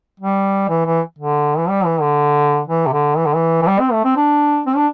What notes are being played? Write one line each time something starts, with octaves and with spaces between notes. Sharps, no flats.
G3
E3
E3
D3
E3
G3
E3
D3
E3
C3
D3
E3
D3
E3
E3
G3
C4
A3
C4
D4
C4
D4